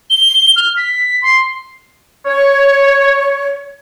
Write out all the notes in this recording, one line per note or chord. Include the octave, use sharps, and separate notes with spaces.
G7
F6
B6
C6
C#5